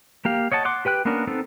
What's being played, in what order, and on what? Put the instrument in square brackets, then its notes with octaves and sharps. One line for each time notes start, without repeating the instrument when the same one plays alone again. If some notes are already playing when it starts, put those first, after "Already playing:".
[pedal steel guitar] A#3 G4 F5
C#5 D#5 F#5 A5
F#5 C6 D6
G4 B4 G5 F#6
A#3 B3 C#4 D4 A#4
B3 C4 D#4 A4